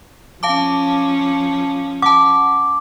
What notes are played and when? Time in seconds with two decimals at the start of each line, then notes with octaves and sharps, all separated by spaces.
0.43 F3 C#4 F5 A5 D6
2.02 F#5 A5 D6